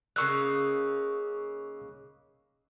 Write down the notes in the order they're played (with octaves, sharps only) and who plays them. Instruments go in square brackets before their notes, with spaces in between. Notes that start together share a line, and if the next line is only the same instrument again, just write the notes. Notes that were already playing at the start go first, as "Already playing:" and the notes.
[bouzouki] C#3 A#3 D#4 [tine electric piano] C#6 E6 F#6